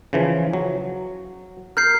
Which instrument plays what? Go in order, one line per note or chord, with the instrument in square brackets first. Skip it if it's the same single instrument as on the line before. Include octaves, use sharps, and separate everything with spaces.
[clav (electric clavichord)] C#3 E3 F3
F#3
[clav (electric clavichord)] A#4 [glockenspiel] F6 G6 C7